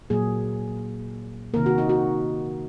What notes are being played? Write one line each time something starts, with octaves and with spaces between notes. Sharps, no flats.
A#2 F#3 A#3 G#4
C3 D#3 A#3 A#4
F#4
D#4
F#4